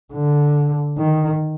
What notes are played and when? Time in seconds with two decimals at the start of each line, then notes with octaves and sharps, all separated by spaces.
0.14 D3
0.98 D#3